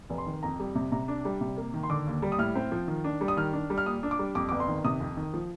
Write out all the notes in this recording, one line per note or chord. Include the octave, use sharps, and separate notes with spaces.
F1
C6
D#3
F2 A#5
G3
C3
C3 A#5
D4
G3
C3
A#3
D#3
C6
D3 D6
D#2
G3
D#6
A2 F6
C4
F3
D#3
D4
G3
D#6
D#3 F6
D4
G3
F6
A#2 D#6
D4
D6
G3
F2 D6
G1 D6
C6
D#3
C3 D#6
F2
D#3
F3